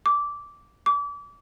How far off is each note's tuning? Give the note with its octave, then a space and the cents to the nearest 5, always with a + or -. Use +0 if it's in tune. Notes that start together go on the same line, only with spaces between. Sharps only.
D6 -15
D6 -35